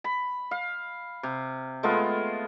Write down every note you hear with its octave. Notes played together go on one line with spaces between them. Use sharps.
B5
F5
C3
G#3 A3 B3 F4